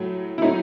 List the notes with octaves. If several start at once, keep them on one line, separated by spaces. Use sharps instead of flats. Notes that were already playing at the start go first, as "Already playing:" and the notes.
Already playing: A2 F#3 A3
E4
A2 F#3 A3 D#4